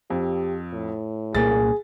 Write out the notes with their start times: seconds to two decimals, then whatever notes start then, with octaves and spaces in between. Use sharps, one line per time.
0.10 F2 G4
0.73 A2
1.35 C2 A#2 A#3 G#4 A6